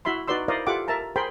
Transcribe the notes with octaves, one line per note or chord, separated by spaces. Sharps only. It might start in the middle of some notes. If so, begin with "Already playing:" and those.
E4 F#4 E5 B5 C6
D#4 F#4 B4 D5 C6 E6
E4 A#4 C5 D5 D#5 F5
F4 G4 A4 E5 F#5 D6
A#4 E5 A5 A#5
G#4 A#4 C5 G5 B5 C6